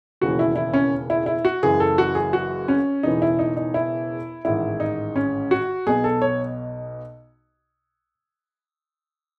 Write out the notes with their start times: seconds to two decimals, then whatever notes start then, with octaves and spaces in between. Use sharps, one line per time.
0.21 E1 D#2 C#3 E3 F#4
0.39 E4
0.56 E4
0.73 C#4
1.10 E4
1.26 E4
1.45 F#4
1.63 F#1 F#2 C#3 E3 G#4
1.80 A4
1.98 F#4
2.15 G#4
2.33 F#4
2.68 C#4
3.03 E1 E2 C#3 E3 D#4
3.22 E4
3.39 D#4
3.57 D#4
3.74 E4
4.45 A1 G#2 D#3 E4
4.80 D#4
5.16 C#4
5.51 F#4
5.86 B1 B2 G#4
6.04 A4
6.22 C#5